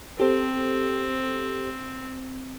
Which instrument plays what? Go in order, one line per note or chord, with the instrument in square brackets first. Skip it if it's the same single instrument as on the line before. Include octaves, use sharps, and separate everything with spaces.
[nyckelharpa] C4 [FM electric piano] G4 A4 C5